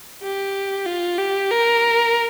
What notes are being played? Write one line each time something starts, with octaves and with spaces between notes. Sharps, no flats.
G4
F4
G4
A#4